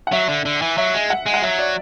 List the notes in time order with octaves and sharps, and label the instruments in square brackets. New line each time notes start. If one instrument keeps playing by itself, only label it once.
[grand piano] F#5
[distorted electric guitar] F#3 [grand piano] E5
[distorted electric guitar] D3
D3
E3
[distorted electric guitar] F#3 [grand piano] E5
[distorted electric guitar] G#3
[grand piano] F#5
[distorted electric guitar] G#3
[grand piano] F#5
[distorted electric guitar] F#3 [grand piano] E5
[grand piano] D5